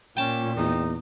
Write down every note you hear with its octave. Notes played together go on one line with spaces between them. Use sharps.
A#2 C#4 G5 A5
E2 D#4